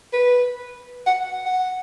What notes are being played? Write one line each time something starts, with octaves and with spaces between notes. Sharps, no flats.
B4
F#5
F#5